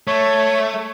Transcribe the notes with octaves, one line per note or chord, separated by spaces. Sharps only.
A3 C#5